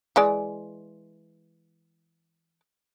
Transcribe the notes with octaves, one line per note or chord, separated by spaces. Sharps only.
E3 G#3 D5